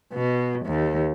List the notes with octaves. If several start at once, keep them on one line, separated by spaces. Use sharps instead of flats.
B2
D#2